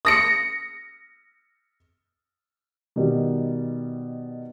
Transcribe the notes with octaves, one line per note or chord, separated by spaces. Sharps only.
D#6 A#6 C#7
B2 D#3 G3